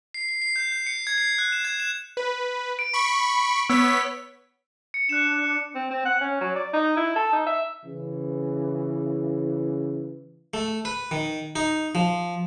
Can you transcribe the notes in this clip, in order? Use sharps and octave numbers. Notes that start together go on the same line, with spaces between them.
C7
C7
C7
G6
G6
C#7
G#6
C7
F#6
E7
G#6
E7
B4
D7
B5 C#6
B3 C#5 E6 B6
C#7
D4 F#6 C#7 E7
C4
C4
F#5
C#4
F#3
D5
D#4
E4
A4
D#4
E5
C#3 E3
A3
B4
D#3
D#4
F3